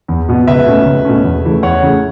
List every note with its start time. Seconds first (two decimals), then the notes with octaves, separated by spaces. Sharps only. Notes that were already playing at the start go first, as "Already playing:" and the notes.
0.08 E2
0.29 B2 B3
0.47 C#2 B4 E5
0.66 B2 A3 C#4
0.85 C#2
1.05 B2 A3 C#4
1.24 E2
1.44 C#3 E3 A3
1.62 E2 C#5 F#5
1.82 C#3 E3 A3